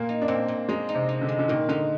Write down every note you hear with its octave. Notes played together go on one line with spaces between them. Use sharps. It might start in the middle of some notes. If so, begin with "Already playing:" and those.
Already playing: A#2 A#3
D#4
D4
A#2 C4
A#2
G#3 D#4
D#4
C3
D#4
D3
G#3
D3
A#2 D#3
D3 D#4